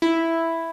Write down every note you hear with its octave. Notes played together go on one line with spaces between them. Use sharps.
E4